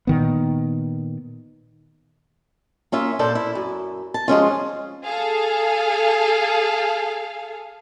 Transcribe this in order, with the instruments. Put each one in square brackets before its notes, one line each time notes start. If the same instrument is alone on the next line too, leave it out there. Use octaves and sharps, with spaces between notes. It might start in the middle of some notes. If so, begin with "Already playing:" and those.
[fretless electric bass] A#2 D#3 B3
[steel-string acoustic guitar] A#3 C#4 F4 E5
A#2 D4 A4 C5
E4
F#2
A5
F3 G#3 C#4 F4
[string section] G#4 A4 F5